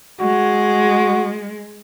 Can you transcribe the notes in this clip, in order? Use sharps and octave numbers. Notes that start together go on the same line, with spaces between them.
G#3 F#4